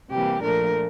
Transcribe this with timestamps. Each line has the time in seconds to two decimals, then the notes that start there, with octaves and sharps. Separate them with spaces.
0.10 C3 E3 G3 A#3 G4
0.42 A#2 F3 A3 D4 A#4